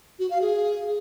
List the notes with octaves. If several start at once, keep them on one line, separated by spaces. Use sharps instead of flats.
F#4
F5
G#4